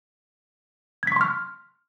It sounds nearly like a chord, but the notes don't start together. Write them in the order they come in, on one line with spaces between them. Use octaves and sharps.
G#6 B6 C#6 C6 F6